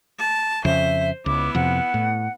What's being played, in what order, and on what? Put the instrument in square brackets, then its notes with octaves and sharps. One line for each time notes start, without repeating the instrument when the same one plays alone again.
[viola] A5
[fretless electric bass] F2 C#3 [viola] C5 [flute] E5
[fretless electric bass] C#2 [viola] B3 E4 [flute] D6
[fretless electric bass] F2 C3 [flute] F#5
[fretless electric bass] A2